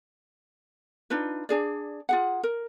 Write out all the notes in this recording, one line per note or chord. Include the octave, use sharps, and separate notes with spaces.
D4 D#4 F4 B4
D4 G#4 D5
F4 G#4 F#5
A#4